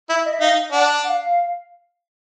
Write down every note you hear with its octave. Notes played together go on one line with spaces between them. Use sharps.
E4 E5
D#5
E5
D#4 F5
D4 F#5
F#5
F5